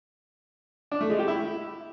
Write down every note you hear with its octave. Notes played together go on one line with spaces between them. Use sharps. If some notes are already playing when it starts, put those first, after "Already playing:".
D4
A3
G#3
G4
E4